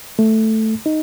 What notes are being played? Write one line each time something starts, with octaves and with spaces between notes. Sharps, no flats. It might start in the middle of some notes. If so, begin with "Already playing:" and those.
A3
D#4